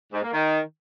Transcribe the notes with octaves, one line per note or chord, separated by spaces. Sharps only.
G#2
A#3
D#3